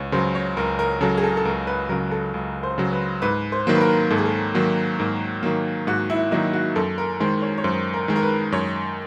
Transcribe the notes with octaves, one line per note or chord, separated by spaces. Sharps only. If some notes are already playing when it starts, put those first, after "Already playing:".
Already playing: C#2 C#5
C#3 F#3 C5
C#5
C#2 A#4
A#4
C#3 F#3 A4
G#4
A4
A4
C#2 A#4
B4
C#3 F#3 A#4
A4
C#2
C5
C#3 F#3
B4
G#2 B4
C5
D#3 F#3 A#3
B4
A#4
G#2 A4
G#4
A4
D#3 F#3 A#3
G#2 A#4
D#3 F#3 A#3
G#2 F#4
E4
D#3 F#3 A#3 D#4
F#4
F#2 A4
A#4
D#3 G#3 C5
C#5
C#5
F#2 C5
A#4
D#3 G#3
A#4
B4
F#2 C#5